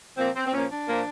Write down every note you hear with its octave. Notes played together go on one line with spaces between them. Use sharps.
A#2 F3 A#3 C4
C4
C4
A#2 F3 A#3 C#4
D4
A#2 F3 A#3